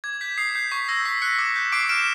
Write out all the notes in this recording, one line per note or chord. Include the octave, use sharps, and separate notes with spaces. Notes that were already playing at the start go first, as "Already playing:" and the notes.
D6 G#6
G6 B6
D#6 C7
G6 C7
C#6 B6
E6 G6 A#6
C#6 B6
F#6 B6 C#7
D6
G6
D6 C7 D7
F6 D7 E7